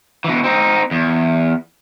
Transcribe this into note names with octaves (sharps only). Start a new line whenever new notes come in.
B2 E3
C4 D#4
E2